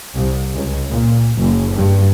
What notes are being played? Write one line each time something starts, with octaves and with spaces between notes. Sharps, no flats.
C2
C#2
A#2
F#1
G2